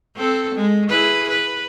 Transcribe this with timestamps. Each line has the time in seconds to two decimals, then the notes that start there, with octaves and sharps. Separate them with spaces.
0.16 C4 A4
0.54 G#3
0.89 E4 G#4 B4
1.30 B4